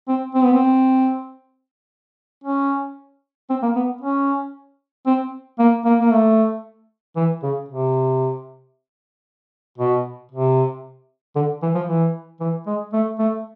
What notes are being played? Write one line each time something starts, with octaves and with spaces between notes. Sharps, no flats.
C4
C4
B3
C4
C#4
C4
A#3
B3
C#4
C4
A#3
A#3
A#3
A3
E3
C#3
C3
B2
C3
D3
E3
F3
E3
E3
G#3
A3
A3